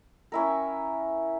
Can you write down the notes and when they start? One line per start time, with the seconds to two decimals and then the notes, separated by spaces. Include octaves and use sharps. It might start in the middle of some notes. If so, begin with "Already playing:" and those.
0.32 C#4 E4 A#4